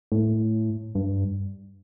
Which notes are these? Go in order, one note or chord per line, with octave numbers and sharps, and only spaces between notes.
A2
G2